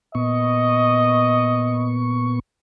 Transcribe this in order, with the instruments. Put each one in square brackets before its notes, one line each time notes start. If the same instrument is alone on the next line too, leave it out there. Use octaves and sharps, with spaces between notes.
[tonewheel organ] A#2 B3 C#6 [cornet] D#5